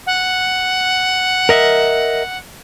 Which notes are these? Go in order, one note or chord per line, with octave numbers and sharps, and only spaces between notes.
F#5
A#4 D#5 E5